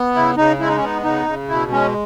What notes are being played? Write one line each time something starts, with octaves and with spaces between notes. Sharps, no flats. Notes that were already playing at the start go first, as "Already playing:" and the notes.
Already playing: B3
C#3 E4
C#3 D#4
G#3 E4
D#4
C#4
B3 D#4
C#3 D#4
C#3
B2 E4
G#3 C#4